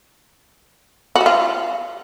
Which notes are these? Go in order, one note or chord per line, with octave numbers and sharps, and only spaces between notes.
F#4
G3
F4